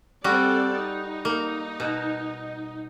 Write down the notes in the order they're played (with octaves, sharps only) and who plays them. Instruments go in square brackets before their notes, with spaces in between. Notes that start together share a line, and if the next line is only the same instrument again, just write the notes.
[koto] G3 F#4 [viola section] C4 A4 D5
[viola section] D#4
[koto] A#3
B2